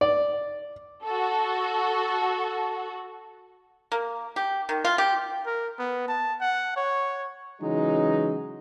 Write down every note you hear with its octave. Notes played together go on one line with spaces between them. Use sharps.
D5
F#4 A4
A#3
G4
D#3
F4
G4
A#4
B3
A5
F#5
C#5
C#3 E3 F#3 G#3 D#4